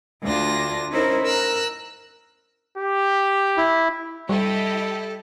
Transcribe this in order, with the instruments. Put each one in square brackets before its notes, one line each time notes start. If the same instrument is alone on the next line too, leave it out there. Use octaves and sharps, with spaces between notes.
[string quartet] D2 D4 F4 A#6
C#4 D#4 E4 A#4 C5
A#4 E6 F#6
[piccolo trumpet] G4
[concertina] E4
[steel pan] G3 [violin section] E4 G4 D#5 [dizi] A4